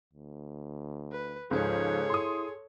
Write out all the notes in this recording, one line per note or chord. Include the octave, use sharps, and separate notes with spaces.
D2
B4
C#2 G#2 F3 G#4 A4 C#5
E4 C6 D#6